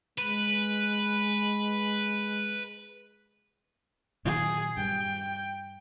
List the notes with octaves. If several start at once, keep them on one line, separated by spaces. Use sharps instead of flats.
G#3 B4
A#2 D#3 F#3 G#4
G2 G5